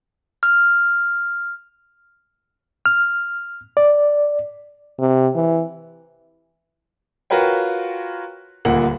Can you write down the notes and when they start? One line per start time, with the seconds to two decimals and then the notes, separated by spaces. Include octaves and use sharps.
0.43 F6
2.86 F6
3.77 D5
4.99 C3
5.35 E3
7.30 F4 F#4 A#4 B4 C#5 G5
8.65 D#1 D2 A#2 A#3 F#5 F#7